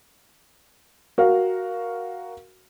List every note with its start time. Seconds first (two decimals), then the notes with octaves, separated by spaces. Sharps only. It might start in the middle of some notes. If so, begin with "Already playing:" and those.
1.18 F#4 A#4 F5